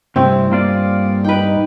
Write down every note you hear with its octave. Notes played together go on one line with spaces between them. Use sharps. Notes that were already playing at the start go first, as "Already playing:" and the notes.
G2 C3 A3 C4 E4
A#3 F4 D5
D#4 B4 G5